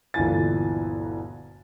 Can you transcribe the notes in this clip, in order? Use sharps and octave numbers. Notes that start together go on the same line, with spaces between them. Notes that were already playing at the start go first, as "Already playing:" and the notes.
G1 D2 A#2 E3 G#5 A6